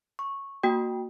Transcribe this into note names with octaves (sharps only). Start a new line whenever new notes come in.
C#6
A#3 F#4 G5